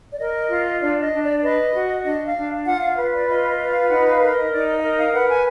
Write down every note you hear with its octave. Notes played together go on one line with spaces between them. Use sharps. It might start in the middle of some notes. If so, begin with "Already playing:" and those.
D5
A#4 D#5
F4
D4 D5
D#5
D4
D5
B4 D#5
F#4
D4 D#5
F5
D4
F4 F#5
F5
B4
D5
F4 D#5
D#5
B4
F5
D#4 F#5
F5
A#4
D#5
D#4 D5
D#5
F5
A#4 D#5
F5
B4 F#5
G#5